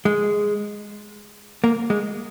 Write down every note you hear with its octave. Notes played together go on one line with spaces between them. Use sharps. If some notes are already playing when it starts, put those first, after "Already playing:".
G#3
A#3
G#3